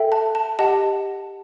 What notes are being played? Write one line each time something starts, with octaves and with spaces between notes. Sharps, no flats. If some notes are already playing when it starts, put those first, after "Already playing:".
Already playing: A4 E5 G5
A5
A5
G4 D#5 F#5 A5